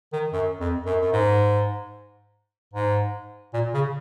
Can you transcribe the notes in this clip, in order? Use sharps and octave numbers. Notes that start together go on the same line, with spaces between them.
D#3
F#2
F2
F#2
F#2
G#2
G#2
A#2
C#3